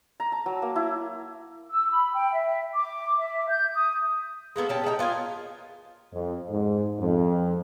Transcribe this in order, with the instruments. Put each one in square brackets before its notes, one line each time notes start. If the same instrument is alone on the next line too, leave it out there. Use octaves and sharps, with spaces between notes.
[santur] A#5
A5
F#3
A#3
E4
[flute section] E6
B5
G5
E5
D6
E5
G6
D#6
[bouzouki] G#3 A#3 B3 A4
C#4 G4 A5
G#3 A#3 D#4 G5
B3 F4 A#4 G#5
[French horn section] F2
G#2
F2